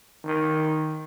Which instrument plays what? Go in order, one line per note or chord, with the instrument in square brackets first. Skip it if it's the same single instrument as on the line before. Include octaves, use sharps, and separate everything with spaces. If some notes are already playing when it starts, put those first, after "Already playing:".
[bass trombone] D#3